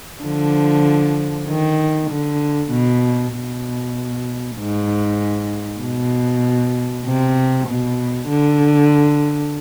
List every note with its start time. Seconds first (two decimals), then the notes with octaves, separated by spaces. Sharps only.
0.24 D3 F3
1.48 D#3
2.10 D3
2.71 B2
3.33 B2
4.57 G#2
5.81 B2
7.05 C3
7.67 B2
8.28 D3